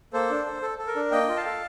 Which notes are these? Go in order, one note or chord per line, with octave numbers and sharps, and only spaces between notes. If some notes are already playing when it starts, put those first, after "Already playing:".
A#3 A4 C5
D4
A4
A4
A4
A#4
D4
A#3 D#5 G5
F4
F5 A5
A4